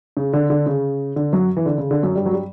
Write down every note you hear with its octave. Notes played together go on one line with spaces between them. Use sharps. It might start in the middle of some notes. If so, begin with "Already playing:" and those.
C#3
D3
D3
C#3
D3
F#2 F#3
E3
D3
C#3
D3
F#2 F#3
G2 G3
F#3
G3